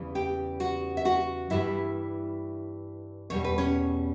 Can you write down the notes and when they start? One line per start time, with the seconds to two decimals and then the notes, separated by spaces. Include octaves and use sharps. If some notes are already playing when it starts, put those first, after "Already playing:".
Already playing: E2 C#3 E3 G3
0.15 G4 G5
0.60 F#4 F#5
0.97 E5
1.05 F#4 F#5
1.50 G2 E3 G3 E4 E5
3.30 E2 B2 G3 C#5
3.44 B4
3.58 C#4 C#5